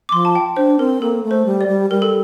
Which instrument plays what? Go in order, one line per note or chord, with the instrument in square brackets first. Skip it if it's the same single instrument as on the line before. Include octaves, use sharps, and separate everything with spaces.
[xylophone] D6
[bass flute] F3 [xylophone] C6
[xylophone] A5
G5
[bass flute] D4 [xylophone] C5
[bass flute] C4 [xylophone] A#4
[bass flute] A#3 [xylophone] A4
[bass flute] A3
[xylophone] C5
[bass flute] G3
[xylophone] D5
[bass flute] G3
[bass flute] G3 [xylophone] A#4
[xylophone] A4